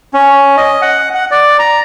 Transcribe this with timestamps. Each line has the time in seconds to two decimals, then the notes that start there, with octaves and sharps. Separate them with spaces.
0.14 C#4
0.57 D#5
0.82 F#5
1.15 F#5
1.31 D5
1.59 A#5